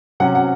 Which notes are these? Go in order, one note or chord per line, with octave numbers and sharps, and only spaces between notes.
C3 F#3 C#4 F#5
F#5